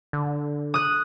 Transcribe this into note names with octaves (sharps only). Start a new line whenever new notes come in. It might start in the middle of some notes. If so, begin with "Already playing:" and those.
D3
D#6 F#6